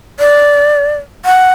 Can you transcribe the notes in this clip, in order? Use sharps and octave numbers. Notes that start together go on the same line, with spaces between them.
D5
F#5